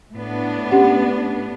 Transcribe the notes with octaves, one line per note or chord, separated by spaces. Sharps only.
A2 B3 D4
C#4 G4 F#5